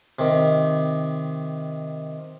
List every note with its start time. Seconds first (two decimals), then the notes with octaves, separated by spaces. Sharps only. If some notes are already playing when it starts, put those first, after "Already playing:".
0.19 C3 D#3